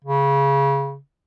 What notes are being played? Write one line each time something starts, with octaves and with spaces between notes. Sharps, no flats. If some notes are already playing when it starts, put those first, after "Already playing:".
C#3